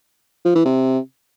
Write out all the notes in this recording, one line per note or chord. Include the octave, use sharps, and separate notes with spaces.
F3
E3
C3